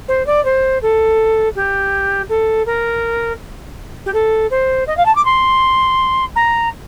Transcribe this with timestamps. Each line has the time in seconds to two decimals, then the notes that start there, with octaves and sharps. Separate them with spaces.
0.08 C5
0.26 D5
0.45 C5
0.82 A4
1.56 G4
2.29 A4
2.66 A#4
4.06 G4
4.14 A4
4.51 C5
4.87 D#5
4.97 F5
5.06 A5
5.15 D6
5.25 C6
6.36 A#5